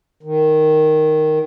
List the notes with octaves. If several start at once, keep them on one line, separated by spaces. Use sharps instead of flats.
D#3